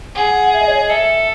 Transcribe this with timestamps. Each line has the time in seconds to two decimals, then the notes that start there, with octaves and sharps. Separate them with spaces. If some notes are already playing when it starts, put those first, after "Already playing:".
0.15 G#4 F#5
0.53 E5
0.61 D#5
0.68 C#5
0.75 D#5
0.90 A4 E5